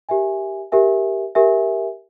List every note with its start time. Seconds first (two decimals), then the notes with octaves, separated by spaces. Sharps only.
0.09 G4 A#4 E5 G#5
0.72 G4 A#4 E5 G#5
1.35 G4 A#4 E5 G#5